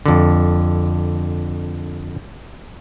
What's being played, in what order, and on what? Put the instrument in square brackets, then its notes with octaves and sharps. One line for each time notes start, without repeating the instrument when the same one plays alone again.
[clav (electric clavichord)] F2 D3